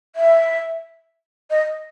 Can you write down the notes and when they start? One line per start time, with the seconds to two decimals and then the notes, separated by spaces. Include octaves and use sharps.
0.15 E5
1.50 D#5